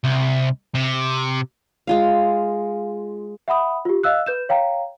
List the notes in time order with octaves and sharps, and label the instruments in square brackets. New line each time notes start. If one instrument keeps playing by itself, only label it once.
[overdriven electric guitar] C2
C3
[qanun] G#3 F4 F5
[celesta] E5 F#5 B5 D#6
F4 G4
D#5 F5 E6 F#6
B4 G6 E7
C#5 F5 G5 A#5